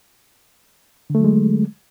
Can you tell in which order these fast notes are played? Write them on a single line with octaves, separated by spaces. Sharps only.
D3 A3 F#3 G#3